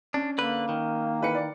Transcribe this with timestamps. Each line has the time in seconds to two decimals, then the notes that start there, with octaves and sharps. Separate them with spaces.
0.14 C#4 D4
0.38 D3 A#3 B4
0.69 D#3
1.21 E3 B4 C#7
1.35 D5